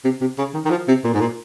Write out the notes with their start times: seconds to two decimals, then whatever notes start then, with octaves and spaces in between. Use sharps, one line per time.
0.04 C3
0.21 C3
0.38 C#3
0.54 D#3
0.65 D#3
0.71 F3
0.88 C3
1.04 A#2
1.14 G#2
1.21 A#2